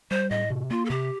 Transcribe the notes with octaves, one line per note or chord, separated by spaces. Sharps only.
G3 C5
A2 D#5
C3
A#3 F4
A4
C3 G4